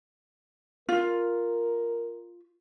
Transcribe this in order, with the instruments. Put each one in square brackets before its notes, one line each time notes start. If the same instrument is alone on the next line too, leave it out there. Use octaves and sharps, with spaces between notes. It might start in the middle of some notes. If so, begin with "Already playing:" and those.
[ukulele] F4 [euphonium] A#4